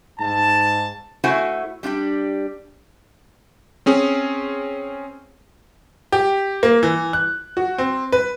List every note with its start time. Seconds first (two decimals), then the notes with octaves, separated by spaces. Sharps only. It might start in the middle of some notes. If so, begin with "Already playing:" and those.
0.20 G#2 A5
1.24 A3 E4 F#4 C5 F#5 G#5
1.83 G3 D4 F4 G4
3.86 C4 C#4 G#4
6.12 G4
6.63 A#3
6.83 E3
7.13 F#6
7.57 F#4
7.78 C4
8.12 B4